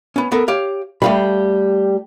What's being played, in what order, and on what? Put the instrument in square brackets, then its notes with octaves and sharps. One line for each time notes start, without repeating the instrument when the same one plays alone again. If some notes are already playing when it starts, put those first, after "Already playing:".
[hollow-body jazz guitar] B3 C#4
B3 A4 A#4
G4 C#5 F5
[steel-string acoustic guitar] G3 G4 [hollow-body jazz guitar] A3 F5 B5